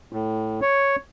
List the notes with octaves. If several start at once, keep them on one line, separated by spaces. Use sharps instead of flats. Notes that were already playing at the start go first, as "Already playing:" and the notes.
A2
C#5